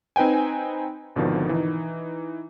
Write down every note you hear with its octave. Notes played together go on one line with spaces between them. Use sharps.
C4 D#4 B4 G5 G#5
G#1 B2 D3 D#3 F3
E3 D#4